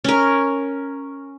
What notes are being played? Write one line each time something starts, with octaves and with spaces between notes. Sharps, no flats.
C#4 A#4